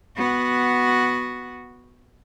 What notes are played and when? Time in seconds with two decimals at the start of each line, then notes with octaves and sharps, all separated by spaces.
0.17 B3 F#4